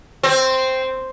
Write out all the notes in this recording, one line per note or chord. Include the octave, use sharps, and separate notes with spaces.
C4